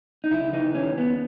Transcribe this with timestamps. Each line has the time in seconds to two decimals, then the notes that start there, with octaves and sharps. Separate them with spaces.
0.24 D#4
0.31 C#2 E4
0.53 E3 D#4
0.75 D#2 C#4
0.97 D#2 B3